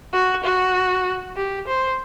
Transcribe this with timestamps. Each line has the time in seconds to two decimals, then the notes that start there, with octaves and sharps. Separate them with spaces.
0.13 F#4
0.44 F#4
1.37 G4
1.68 C5